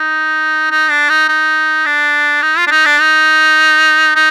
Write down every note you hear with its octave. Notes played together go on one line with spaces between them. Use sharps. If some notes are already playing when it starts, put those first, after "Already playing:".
Already playing: D#4
D#4
D4
D#4
D#4
D4
D#4
F4
D4
D#4
D4
D#4
D#4